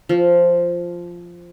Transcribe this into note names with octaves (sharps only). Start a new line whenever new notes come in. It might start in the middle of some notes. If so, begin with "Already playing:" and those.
F3